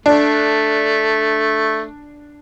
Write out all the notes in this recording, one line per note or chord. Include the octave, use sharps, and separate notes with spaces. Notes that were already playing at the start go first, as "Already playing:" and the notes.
A3 D4